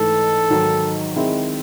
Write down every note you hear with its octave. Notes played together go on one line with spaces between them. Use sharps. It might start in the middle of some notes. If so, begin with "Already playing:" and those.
Already playing: G#2 E3 A3 A4
G#2 D#3 F#3
D#3 G#3 C4 E4 G#4